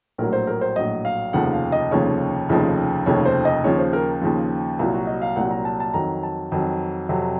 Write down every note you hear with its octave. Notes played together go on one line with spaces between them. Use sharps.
A#1 A2 F#3 A#4
C5
A#4
C5
A#1 A2 F#3 D#5
F5
F1 D#2 C#3 F3 F#5
F5
D#5
F1 D#2 C#3 F3 C#5
F1 D#2 C#3 F3
F1 D#2 C#3 F3 C#5
C5
D#5
D#2 C#3 F3 C#5
C5
A#4
D#2 C#3 F3
C2 A#2 F#3 F4
F#4
D#5
F5
C2 A#2 F#3 F#5
A#5
A5
A5
F2 D#3 F#3 A#5
A5
F2 D#3 F#3
F2 C3 F#3